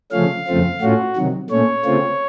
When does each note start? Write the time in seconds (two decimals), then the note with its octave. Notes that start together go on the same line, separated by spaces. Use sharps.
0.11 C#3 F3 A3 C#4 F5
0.47 F2 C#3 A3 C4 F4
0.81 A2 A3 C#4 F4 F#4
1.16 C3 D#3 F#3
1.50 A#2 A3 C#4 C#5
1.85 C#3 A3 C4 F4